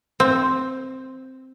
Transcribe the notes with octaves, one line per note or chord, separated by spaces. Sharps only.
C4